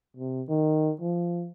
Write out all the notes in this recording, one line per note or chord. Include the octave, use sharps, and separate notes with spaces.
C3
D#3
F3